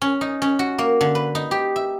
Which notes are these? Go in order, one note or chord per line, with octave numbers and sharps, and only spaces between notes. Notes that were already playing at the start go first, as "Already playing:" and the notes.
C#4
D#4
C#4
F#4
A#3
D3
B4
D#4
G4
E5